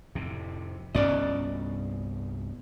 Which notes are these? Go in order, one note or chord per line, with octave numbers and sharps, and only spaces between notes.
F2 A2 C3
C2 G2 B3 C#4 D5 D#5